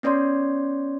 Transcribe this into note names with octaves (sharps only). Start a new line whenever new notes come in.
B3 C#4 C#5 D5 C6